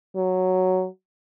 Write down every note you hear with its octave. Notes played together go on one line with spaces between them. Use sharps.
F#3